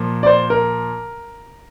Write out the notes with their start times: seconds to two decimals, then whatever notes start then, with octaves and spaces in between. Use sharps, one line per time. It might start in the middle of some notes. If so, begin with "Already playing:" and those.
Already playing: A#2 F3 A#3
0.23 D5
0.26 C5
0.50 A#4